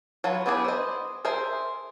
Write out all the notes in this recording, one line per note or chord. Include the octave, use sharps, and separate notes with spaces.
F#3 F4 B4
B3 E4 G4 G#4 B4
C5 D#5
G#4 A#4 C5 E5